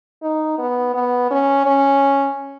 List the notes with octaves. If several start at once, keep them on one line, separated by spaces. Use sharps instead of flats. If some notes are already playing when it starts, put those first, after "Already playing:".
D#4
B3
B3
C#4
C#4